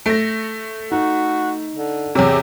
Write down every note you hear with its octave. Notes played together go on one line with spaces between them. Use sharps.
A3 A#6 D7
D#4 F#4
D3
E2 C3 G#4 C#5